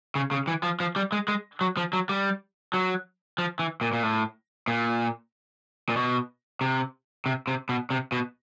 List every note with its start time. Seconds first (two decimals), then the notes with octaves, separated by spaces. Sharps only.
0.15 C#3
0.31 C#3
0.48 E3
0.63 F3
0.80 F3
0.96 G3
1.12 G#3
1.28 G#3
1.61 F#3
1.77 F3
1.93 F#3
2.09 G3
2.74 F#3
3.38 F3
3.59 E3
3.81 A#2
3.93 A#2
4.03 A2
4.68 A#2
5.89 A#2
5.96 B2
6.61 C3
7.26 C3
7.47 C3
7.69 B2
7.90 C3
8.12 B2